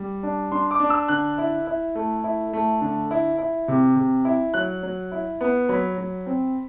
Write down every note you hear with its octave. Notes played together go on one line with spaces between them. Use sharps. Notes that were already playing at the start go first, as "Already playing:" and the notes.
Already playing: G3
D4
D4 C6
D6
D4
E6
D3 F#6
E4
E4
A3
E4
A3
D3
E4
E4
C3
C3
E4
F#3 F#6
F#3
E4
B3
F#3 B5
F#3
C4